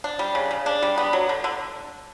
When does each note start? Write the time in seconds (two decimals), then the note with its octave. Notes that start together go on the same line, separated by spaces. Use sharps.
0.04 D4
0.19 G3
0.35 C#3
0.51 C#3
0.66 D4
0.83 G3
0.98 B3
1.13 F#3
1.29 D3
1.44 D3